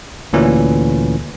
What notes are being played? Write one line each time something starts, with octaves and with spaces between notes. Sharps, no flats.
D2 A#2 E3 C#4